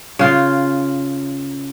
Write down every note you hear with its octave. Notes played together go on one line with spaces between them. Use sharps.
C#3 F4 F5